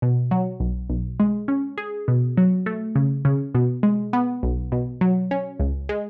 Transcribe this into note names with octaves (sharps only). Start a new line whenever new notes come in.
B2
F#3
B1
B1
G#3
C#4
G#4
B2
F#3
A3
C#3
C#3
B2
G#3
B3
B1
B2
F#3
C#4
C#2
G#3